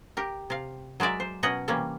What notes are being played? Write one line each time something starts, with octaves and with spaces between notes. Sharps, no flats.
G4 A#4
C3 F5
F#3 G#3 A#4 D5 E5
C5
B2 C#4 A#4 D#5 F#5
C3 E3 G3 A#3 C#4